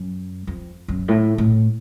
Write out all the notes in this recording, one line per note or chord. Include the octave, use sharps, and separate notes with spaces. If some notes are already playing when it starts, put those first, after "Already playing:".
Already playing: F#2
F2
F#2
A2
A2